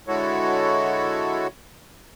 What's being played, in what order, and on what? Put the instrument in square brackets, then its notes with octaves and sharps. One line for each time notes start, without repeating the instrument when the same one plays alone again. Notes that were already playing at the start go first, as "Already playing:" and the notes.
[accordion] D3 G#3 E4 F#4 A4 C#5